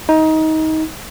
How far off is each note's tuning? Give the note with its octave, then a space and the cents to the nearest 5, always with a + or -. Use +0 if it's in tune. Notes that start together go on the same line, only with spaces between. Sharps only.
D#4 +20